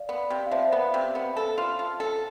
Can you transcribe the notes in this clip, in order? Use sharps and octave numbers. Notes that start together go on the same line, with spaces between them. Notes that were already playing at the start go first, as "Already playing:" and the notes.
Already playing: D5 F5
B3
C3
F5
F3 C5 E5
B3
C3
B3
A4
F4
F4
A4